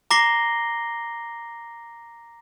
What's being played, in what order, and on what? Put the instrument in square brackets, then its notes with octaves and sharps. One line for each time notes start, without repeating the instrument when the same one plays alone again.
[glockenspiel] A#5 D6 A#6 C7 G7